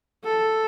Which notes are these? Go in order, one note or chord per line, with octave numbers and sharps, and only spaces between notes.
A4